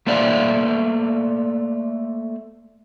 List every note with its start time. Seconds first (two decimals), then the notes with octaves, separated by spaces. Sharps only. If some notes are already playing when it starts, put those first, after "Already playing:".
0.07 A3 A#3 C5 D5 E5 F5